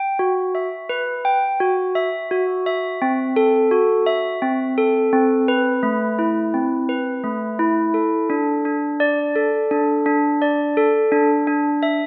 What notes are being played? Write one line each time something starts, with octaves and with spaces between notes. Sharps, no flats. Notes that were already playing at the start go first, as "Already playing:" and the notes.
Already playing: G5
F#4
E5
B4
G5
F#4
E5
F#4
E5
C4
A4
F#4
E5
C4
A4
C4
B4
A3
E4
C4
B4
A3
E4
A4
D4
D4
D5
A4
D4
D4
D5
A4
D4
D4
E5